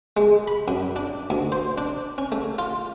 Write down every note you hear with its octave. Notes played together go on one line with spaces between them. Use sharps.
G#3
B5
F#2
D4
D2
C5
D4
C#4
A3
F4